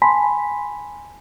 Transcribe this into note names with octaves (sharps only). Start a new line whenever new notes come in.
G#5 A5 B5 C6 B6